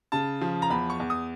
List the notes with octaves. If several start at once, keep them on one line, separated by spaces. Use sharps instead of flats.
C#3 A5
F3
A#5
E2 B5
C#6
E2
D#6